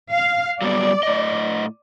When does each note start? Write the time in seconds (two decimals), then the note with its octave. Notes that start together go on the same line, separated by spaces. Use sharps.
0.11 F5
0.61 F#3 G3 B3 D5
1.03 A2 D#5